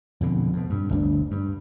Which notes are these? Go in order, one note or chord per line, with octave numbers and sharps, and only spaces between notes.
F2 B2 D3
F2 B2
G2
G1 D2 D4
G2